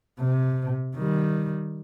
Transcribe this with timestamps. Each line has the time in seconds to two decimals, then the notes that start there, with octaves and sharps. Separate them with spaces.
0.20 C3
0.95 D#3 G3